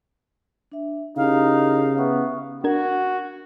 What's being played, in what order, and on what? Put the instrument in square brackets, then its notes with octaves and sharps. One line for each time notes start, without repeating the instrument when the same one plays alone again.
[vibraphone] D4 E5
[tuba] C#3 [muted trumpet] D#4 [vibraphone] E4 G4 A#4 [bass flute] F5
[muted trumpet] B3 [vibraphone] E5 F5 C#6
[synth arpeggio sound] D4 A#4 G#6 [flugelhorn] F#4